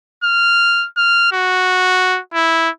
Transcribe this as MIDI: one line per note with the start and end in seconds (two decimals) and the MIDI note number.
0.24 0.86 89
0.97 1.27 89
1.32 2.20 66
2.34 2.69 64